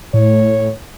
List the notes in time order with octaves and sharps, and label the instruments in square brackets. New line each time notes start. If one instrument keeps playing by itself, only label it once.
[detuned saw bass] A2 [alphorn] C#5